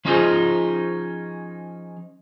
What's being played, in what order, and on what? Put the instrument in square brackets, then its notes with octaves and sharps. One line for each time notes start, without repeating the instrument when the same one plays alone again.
[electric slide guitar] F3 C#4 D#4 F4 G#4 C5